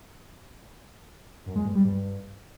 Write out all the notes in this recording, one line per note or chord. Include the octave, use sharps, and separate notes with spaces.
F#2
G#3
G2
G3
G2